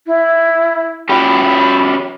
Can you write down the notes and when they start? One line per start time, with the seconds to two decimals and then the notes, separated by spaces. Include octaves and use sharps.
0.07 E4
1.09 C#4 F#4 G4 B5